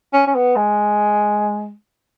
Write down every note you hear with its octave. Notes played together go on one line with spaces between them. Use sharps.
C#4
C#4
B3
G#3